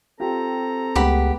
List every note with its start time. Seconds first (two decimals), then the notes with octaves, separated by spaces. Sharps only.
0.20 C4 F4 G4 A4 A#5
0.96 C#2 G#3 A3 B3 G4 F#5 B5